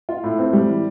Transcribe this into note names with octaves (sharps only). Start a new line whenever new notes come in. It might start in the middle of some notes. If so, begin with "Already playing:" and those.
F4
A2
C4
G3
E3